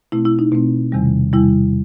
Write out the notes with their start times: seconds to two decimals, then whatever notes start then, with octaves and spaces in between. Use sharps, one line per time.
0.12 B2 A3 C4 E4
0.25 E4
0.39 D#4
0.52 B2 A3 C4
0.92 E2 C3 D#3 G3
1.33 E2 C3 D#3 G3 E4